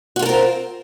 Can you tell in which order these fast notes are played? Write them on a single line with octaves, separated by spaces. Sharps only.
F#4 F4 A4 A#4 C4